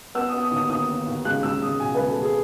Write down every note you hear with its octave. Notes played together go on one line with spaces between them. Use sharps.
B3 E6
B3 D#6
D#6
D#2
D#6
D#2 D#6
D#3
D#2
C#2 F#6
C#2 E6
C#2 D#6
B2 G#5
C#2 B4
A4
C#2 G#4